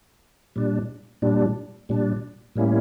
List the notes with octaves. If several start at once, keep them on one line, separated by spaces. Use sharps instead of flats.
A#2 G3 D4
A#2 G3 D4
A#2 G3 D4
A2 G3 A#3 C#4 E4